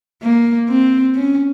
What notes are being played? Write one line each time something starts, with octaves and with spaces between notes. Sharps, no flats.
A#3
C4
C#4